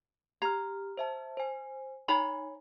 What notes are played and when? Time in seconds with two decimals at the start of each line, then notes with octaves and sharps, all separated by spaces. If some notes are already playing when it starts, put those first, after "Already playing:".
0.42 G4 A#5 F6
0.97 C5 E5 A5
1.37 C5 G#5
2.08 D#4 C#5 G#5 A#5 B5